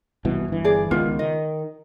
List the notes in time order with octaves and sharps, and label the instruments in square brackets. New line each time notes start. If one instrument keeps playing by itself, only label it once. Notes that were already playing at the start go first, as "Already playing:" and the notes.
[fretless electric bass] C2 B2 E3
G1 E3
[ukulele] G#4 D5
[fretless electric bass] C#2 D#3 B3 [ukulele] F4
[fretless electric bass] D#3 [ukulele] D#5